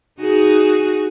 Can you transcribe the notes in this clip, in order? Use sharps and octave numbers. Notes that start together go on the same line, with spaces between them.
D#4 F#4 G#4